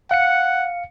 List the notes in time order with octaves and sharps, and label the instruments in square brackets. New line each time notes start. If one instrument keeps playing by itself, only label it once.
[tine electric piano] F5 C#7 [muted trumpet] F#5